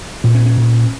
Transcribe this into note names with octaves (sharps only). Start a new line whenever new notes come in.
A#2 C#4
C#4
C#4
A#2